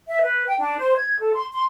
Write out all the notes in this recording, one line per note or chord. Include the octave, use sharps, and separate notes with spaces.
E5
B4
G5
D4
C5
G#6
A4
C6
C6